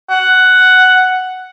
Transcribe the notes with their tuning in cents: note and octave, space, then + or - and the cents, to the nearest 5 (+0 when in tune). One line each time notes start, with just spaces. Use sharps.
F#5 +5